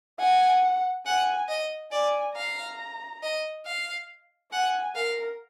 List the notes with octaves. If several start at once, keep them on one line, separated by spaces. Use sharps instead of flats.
F#5 G#5
F#5 G#5
D#5
D5 G#5
F5 A#5
D#5
F5
F#5 G#5
A#4 F5